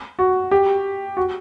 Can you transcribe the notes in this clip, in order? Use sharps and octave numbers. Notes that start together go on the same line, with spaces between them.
F#4
G4
F#4